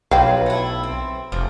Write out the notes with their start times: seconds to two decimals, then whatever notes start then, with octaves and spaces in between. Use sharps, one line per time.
0.11 B1 F3 F#3 B4 F5 G5
0.46 A3 E4
0.83 C4
1.32 F1 F3